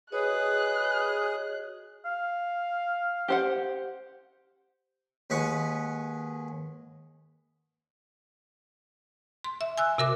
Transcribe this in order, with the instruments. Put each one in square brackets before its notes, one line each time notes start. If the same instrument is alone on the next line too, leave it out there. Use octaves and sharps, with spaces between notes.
[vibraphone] F#4 C#5 D#5 [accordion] G#4 [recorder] B4 [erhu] F#6
[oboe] F5
[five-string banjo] G4 C5 F#5
[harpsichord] D#2 G#3 G#4 B4 F#5 C#6
[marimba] C6
E5
G#5 E6 F#6
C3 F#4 A#4 E5 D6